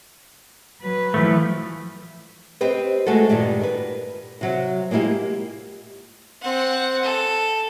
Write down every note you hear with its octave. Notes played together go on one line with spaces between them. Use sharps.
F#3 B4
E3 F3 A3
C4 G4 B4 C5 D#5
G#3 A3 F#4 A4
G2 A#2 D#3 G3
A#4 B4
C3 F#3
G#3 A#3 B3 E4 F4 G4
C4 F#5
A4